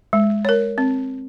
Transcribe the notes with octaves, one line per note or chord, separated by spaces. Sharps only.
G#3
A#4 C#5
C4